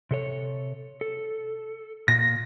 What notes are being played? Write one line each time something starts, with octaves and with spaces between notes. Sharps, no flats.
C3 A4 C#5
A4
A#2 A#6